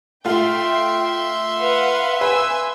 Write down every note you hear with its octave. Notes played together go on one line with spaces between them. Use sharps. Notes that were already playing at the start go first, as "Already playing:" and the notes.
A3 F4 E5 G5 C6
B4 F5 F#5
B4 G#5 E6